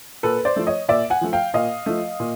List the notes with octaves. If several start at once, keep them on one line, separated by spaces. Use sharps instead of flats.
A#2 A4 B4
C5 D5
F3 A3
C#5 D#5
A#2 D5 E5
F#5 G#5
F3 A3
F5 G5
A#2 D#5 F5
F3 A3
A#2